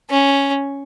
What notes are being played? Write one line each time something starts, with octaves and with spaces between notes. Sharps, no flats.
C#4